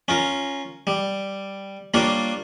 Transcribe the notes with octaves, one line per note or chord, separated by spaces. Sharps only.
C#4 F4 A#4
G3
G3 A#3 D4 F4 C#5